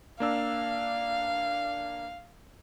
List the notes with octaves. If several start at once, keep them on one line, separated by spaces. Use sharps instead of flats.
A#3 D4 F5 E6